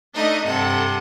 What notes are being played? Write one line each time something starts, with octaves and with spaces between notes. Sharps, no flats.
A3 D4 D#4 D#5
G2 C3 A4 F#5